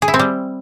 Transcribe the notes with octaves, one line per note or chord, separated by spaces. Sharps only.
G#4
E4
C4
G3